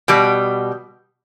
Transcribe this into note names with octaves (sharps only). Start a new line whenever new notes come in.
B2 G3